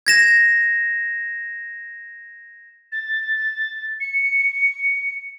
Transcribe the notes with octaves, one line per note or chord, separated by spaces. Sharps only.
G#6 A#6 E7
A6
C#7